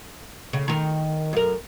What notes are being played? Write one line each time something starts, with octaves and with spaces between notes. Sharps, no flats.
C#3
D#3 A#4
F#2 A#4